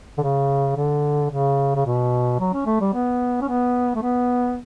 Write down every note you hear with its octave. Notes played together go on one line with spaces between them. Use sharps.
D3
C#3
D3
C#3
C#3
B2
F#3
C#4
A3
G3
B3
C#4
B3
A3
B3